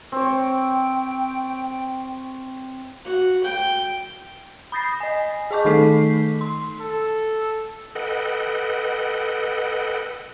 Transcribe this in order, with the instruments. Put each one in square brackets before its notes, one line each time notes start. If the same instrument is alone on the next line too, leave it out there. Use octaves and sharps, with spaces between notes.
[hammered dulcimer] C4 C#5 [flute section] G5
[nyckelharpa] F#4
G5
[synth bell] B5 D#6 G6 A6 A#6 C7
D#5 G#5
G#4 D#5 A5 C#6 D6 G6
D#3 A3 D#4 A4 B6 C7
C6
[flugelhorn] A4
[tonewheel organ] A4 B4 D#5 F#5 G5